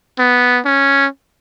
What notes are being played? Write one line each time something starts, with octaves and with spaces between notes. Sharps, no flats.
B3
C#4